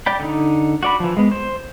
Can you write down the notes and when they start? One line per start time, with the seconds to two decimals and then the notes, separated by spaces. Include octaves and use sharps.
0.06 D5 G5 B5
0.20 D3 D#4
0.83 F#4 D5 B5
1.00 E3 F3
1.17 G#3 B3
1.31 C5